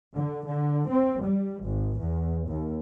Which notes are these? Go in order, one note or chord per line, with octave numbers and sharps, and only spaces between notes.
D3
D3
C4
G3
G#1
E2
D#2